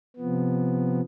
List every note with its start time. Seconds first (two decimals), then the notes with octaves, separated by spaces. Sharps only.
0.17 C3 F3 B3